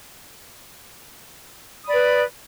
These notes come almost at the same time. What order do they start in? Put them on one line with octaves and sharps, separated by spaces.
D#6 B5 D5 B4